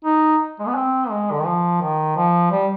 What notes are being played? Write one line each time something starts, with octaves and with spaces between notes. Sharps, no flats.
D#4
G#3
B3
C4
G#3
D3
D#3
F3
D#3
F3
G3